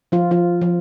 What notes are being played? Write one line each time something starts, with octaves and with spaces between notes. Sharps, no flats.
F3 F4
F3 F4
F3